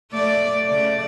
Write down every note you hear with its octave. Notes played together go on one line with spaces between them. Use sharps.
A3 D5
C#3 A3 D5